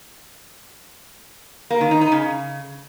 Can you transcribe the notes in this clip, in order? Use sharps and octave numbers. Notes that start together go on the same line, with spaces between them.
A#3
D#3
D#4
D#4
C#3